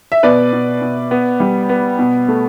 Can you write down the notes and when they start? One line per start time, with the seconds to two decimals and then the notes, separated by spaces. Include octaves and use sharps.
0.12 E5
0.23 B2 B4 D5
0.53 B2
0.82 B2
1.11 B3
1.40 G3
1.69 B3
1.99 B2
2.28 A3